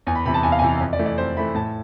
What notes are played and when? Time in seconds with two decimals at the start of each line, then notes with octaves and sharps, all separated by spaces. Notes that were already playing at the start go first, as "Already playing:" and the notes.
0.07 E2 G#5
0.15 B5
0.26 C3 E3 B5
0.34 A5
0.43 E2 G#5
0.52 F5
0.59 G#5
0.62 C3 E3
0.80 F2
0.93 D5
0.99 E3 A3
1.06 D5
1.18 F2 C5
1.37 E3 A3 B5
1.55 A2 A5